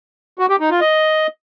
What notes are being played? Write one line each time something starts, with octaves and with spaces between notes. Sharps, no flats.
F#4
G4
D#4
F4
D#5